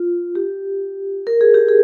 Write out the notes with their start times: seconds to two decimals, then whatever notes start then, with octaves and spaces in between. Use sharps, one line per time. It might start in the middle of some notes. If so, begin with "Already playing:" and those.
Already playing: F4
0.35 G4
1.27 A#4
1.41 G#4
1.54 G4
1.68 G#4